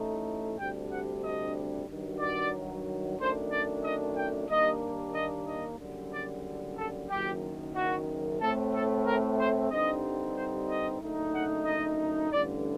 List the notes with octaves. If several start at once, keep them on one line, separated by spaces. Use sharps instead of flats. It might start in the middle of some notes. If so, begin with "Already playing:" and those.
Already playing: A1 A2 A3 D#4
D2 C3 G3 D4 G5
F#5
D#5
G2 D#3 F#3
D5
F#2 D#3 A3 D4 C5
D5
D#5
G5
D#2 D#3 G3 A#3 D4 D#5
D#5
D#5
F#1 F#2 D3 G3
D5
A4
F#1 F#2 D#3 G4
F#4
A2 A3 C4 A4
A4
A#4
C5
G2 D3 G3 C4 D#4 D#5
C5
D#5
F#1 F#2 D3 A3 D#4
F#5
D#5
A1 G2 D3 D5